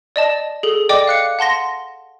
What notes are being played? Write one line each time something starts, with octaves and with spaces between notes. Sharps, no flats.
D5 D#5 A5
G#4 A4
D5 D#5 G5 D6
F5 F#6 C#7
F#5 A5 C6 A#6